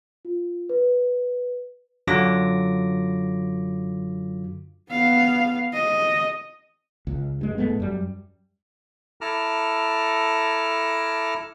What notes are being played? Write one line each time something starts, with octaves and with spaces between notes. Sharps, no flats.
F4
B4
F#2 D3 F#3 F4 D6 A#6
B3 F5
D#5
C#2
G2 G#3
G#2 G#3 A3 B3
F#2 G3
E4 A4 A5 A#5 D6 F6